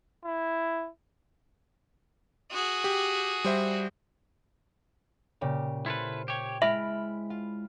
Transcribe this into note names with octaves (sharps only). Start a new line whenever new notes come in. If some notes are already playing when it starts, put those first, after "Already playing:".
E4
F#4 G#4
G4
G3 C5 E5
A#2 C#3 G4
E4 A4 B4 C5 C6 F6
G4 C#5 G5 G#6
G#3 E4 E5 B5 F6 A6
F4